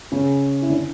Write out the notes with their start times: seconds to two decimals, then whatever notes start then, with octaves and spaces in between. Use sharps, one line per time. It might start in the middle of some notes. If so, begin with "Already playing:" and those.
0.12 C#3 C#4
0.62 E4
0.70 D3 D4